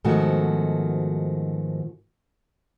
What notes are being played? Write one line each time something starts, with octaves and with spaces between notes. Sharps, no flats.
G#2 B2 D#3 F3 A3 F#4